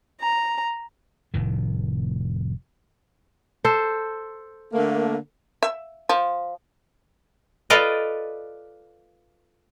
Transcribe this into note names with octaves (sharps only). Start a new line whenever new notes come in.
A#5
F1 A2 D#3
A4 C5
D3 A3 A#3
E5
F3
F4 A4 B4 D5 D#5